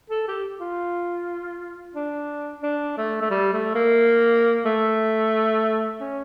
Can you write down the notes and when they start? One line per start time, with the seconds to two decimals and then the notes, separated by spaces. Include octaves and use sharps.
0.10 A4
0.28 G4
0.61 F4
1.95 D4
2.63 D4
2.97 A3
3.21 A3
3.31 G3
3.53 A3
3.75 A#3
4.66 A3
6.01 C#4